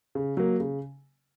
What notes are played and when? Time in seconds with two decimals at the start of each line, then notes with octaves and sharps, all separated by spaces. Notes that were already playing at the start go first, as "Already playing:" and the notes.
0.15 C#3
0.37 F#3 A#3
0.60 C#3